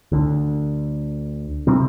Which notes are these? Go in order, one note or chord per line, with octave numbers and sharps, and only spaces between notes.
D2 D3
C3 G3 C4